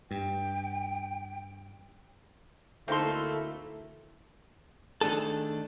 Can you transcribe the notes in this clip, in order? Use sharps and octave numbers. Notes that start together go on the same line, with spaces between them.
G2 G5
D2 A3 A#3 C4 D#4 E4 A4 C6
D#3 A3 D4 G#4 A4